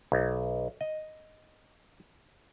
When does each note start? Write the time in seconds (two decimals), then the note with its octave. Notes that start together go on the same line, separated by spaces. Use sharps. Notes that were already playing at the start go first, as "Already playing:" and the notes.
0.12 B1
0.81 D#5